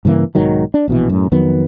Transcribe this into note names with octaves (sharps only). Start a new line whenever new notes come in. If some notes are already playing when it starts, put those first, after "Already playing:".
G2 C#3 E3 A#3
B1 G#2 D#3 F#3
D4
A#1 B2 E3
F#2 A2
F2 D#3 F#3 B3